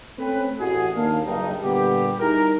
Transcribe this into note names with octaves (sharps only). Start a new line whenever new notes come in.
A3 C4 C#4 B4
A1 F#4 G#4
D#2 A#3 D4 F5
F#1 G2 D#4
A#2 D3 G3 B3 G4
G3 D#4 E4 G#4 A#4